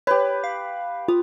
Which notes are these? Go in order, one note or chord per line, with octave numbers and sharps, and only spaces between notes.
G4 B4 C#5
F5
F4 D#6